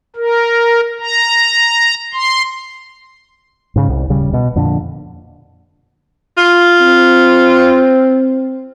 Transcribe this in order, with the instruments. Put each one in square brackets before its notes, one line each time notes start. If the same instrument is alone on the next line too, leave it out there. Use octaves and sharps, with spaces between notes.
[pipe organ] A#4
A#5
C6
[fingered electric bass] G#2 C#3
C2
D#1 C#3 G3
B2
F2 A#2 D3
[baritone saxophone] F4
[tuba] C4